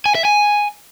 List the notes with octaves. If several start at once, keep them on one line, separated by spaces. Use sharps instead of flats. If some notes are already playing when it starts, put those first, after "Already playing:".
G#5
E5
G#5